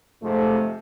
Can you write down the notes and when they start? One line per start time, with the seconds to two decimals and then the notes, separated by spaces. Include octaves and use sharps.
0.23 F2 G#2 C3 F3 A3